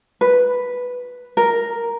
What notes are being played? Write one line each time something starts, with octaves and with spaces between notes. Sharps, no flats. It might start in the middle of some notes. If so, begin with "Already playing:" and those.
B4
A#4